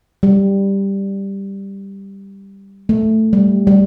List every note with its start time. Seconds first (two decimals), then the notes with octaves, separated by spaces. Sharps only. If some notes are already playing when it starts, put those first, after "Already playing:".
0.23 G3
2.89 A3
3.33 G3
3.67 G3